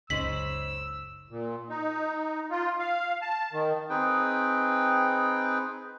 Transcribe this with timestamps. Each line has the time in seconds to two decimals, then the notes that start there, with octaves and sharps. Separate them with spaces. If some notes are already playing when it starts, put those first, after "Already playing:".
0.10 F#1 C#2 C#3 D#4 C5 E6 B6 F#7
1.30 A#2
1.69 D#4
2.51 F4
2.79 F5
3.22 A5
3.52 D#3
3.90 C4 D#4 G#4 B4 G5